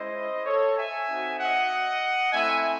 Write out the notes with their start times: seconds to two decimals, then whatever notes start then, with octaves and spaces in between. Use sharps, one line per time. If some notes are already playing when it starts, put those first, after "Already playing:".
Already playing: G#3 C#4 E4 C5 D#5
0.46 A4 C#5
0.77 E5 G#5
1.08 C4 D#4 F#4
1.40 D#5 F#5
2.32 A3 C4 E4 E5 G#5